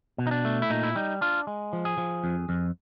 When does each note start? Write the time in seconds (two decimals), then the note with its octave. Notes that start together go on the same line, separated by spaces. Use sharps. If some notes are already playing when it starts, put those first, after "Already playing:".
0.18 B2
0.27 D#4
0.31 D4
0.45 A3
0.62 E4
0.70 A#2 D#4
0.83 E4
0.95 G3 D#4
1.21 D4 F4
1.47 G#3
1.73 F3
1.85 G#4
1.98 F3
2.24 F2
2.49 F2